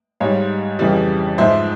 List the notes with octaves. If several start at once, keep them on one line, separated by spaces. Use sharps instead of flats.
G#2 G3 C#5 F5
F2 C#3 E3 G3
G#2 F3 C5 E5